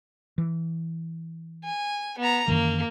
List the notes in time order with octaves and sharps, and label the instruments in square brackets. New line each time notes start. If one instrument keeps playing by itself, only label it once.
[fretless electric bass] E3
[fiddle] G#5
B3 A#5
[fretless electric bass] F#2 D#3 E3 [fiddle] A#3